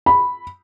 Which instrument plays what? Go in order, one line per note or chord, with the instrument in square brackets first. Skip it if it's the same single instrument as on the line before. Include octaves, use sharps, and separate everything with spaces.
[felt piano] B5